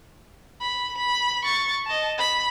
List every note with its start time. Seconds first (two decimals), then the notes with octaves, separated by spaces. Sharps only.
0.61 B5
0.98 B5
1.45 C#6 A6
1.87 D#5 A5
2.18 B5